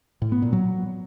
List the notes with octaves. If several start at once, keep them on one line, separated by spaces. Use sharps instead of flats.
A2
B3
A#2
F#3